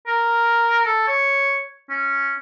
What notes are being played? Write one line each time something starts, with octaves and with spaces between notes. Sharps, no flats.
A#4
A4
C#5
C#4